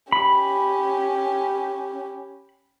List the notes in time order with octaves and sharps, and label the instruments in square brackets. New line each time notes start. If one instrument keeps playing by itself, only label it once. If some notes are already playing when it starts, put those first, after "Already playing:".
[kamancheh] C#4 G4 [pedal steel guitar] B5